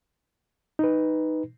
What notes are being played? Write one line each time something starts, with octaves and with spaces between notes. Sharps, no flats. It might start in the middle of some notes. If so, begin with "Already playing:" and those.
D#4 B4